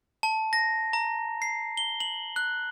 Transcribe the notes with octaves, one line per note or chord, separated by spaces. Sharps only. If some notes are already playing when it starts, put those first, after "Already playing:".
A5
A#6
A#5
C7
G7
F#7
F#6